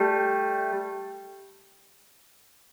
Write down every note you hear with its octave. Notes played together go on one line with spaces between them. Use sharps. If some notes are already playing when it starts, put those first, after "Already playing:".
Already playing: G3 A3